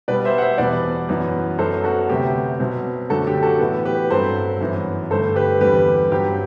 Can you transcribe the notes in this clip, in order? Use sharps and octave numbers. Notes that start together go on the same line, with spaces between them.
B2 G3 B3 B4 D5
C5 E5
F#5
C5 E5
E2 B2 G3 B3 B4 D5
F#2 E3 B3
F#2 F#3 B3 A4 C5
F#4 A4
D2 C3 F#3 B3 G4
B2 F#3 C4
F#2 D3 A3 F#4 A4
G4
F#4 A4
A2 E3 B3
G4 B4
G2 F#3 C4 A4 C5
F#2 E3 B3
G2 D3 A3 A4 C5
G4 B4
E2 D3 G3 C4 G4 B4
G2 F#3 C4 G4